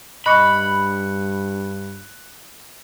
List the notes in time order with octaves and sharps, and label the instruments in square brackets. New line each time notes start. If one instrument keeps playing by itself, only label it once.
[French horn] G2 [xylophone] D#5 C#6 D6 [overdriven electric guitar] B5 [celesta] F#6 C#7